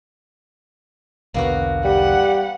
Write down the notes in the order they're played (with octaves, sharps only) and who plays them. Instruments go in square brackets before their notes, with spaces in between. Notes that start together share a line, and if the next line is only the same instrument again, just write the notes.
[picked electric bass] B1 E2 D3 [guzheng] A#3 B3 F#4
[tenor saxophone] G3 [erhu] F#5